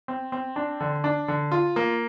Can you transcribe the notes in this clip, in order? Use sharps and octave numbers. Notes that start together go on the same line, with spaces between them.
C4
C4
D4
D3
D4
D3
F4
A#3